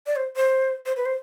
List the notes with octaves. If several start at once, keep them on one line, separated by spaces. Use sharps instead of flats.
D5
C5
C5
C5
B4
C5